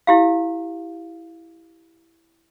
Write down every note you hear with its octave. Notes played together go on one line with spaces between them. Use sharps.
E4 G4 F5